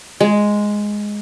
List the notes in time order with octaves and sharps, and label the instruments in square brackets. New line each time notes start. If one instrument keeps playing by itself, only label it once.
[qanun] G#3